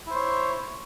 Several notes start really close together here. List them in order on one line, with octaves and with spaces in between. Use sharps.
E4 C5 C#5